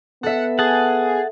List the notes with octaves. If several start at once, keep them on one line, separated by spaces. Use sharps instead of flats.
B3 A4 E5 F#5
G#4 F#5 A5